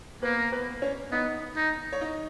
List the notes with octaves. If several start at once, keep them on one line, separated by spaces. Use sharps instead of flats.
A#3 B3 B4
B3 B4
C#4 C#5
B3 D#4 D#5
D#4
C#5
D#4 D#5